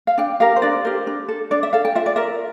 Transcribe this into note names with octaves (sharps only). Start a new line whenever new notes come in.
F5
D4 G5
G4 A#4 F5
C5
D4 D5
G4 A#4 C5
D4
A4
D4 D5
E5
A4 F5
G5
F4 E5
D5
A#4 E5